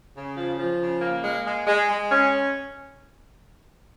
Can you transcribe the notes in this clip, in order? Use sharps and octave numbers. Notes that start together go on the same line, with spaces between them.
C#3
F3
F3
C#3
A#3
G#3
G#3
G#3
G#3
C#4